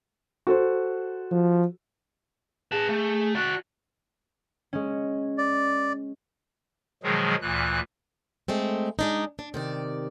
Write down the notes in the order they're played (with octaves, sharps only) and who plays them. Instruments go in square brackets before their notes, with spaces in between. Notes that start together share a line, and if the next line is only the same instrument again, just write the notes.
[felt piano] F#4 A4 C5
[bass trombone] F3
[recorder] G#4 [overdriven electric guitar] B4 A5
[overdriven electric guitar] A3
[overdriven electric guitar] F#4 D5 [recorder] F#6
[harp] G#3 C#4
[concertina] D5
[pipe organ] B2 D#3 F3 F#3 G#3 G#4
D2 A#2 E3 F#6
[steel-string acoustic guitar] G#3 A3 C4
G#3 D4 D#4
D4
C3 D#3 D5